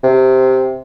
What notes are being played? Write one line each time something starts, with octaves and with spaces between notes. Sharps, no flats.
C3